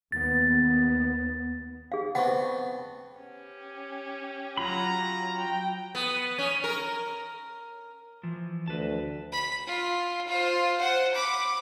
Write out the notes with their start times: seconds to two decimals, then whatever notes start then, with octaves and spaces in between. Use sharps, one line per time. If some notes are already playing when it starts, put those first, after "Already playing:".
0.12 D#2 B3 A6
1.92 G#4 F5
2.15 B3 C4 D4 F#5 C#6
3.20 C#4 G4
4.57 F#3 F4 A#5 B5
5.36 G5
5.95 B3
6.39 C#4
6.64 A#4
8.23 E3 F3
8.68 D2 B4 A5
9.32 B5
9.66 F4
10.27 F4 C5
10.78 C5 F#5
11.14 B5 D6